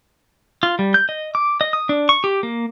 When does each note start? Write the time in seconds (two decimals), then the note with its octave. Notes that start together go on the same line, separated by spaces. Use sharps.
0.63 F4
0.79 G3
0.94 G6
1.09 D#5
1.35 D6
1.61 D#5
1.73 D#6
1.89 D4
2.09 C#6
2.24 G4
2.43 A#3